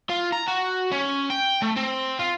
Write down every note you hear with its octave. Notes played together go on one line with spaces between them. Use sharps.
F4
A#5
F#4
C#4
G5
A3
C4
F4